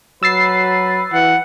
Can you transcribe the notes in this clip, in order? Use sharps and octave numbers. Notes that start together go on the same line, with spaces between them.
F#3 B4 E6 A6 C7
E3 F#5